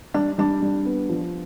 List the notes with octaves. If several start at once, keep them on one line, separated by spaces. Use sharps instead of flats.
G3 D4
G3 D4
G3
B3
F3